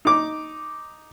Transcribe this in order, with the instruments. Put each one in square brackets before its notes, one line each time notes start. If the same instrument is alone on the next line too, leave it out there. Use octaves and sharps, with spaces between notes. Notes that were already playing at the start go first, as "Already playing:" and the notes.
[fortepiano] D#4 D6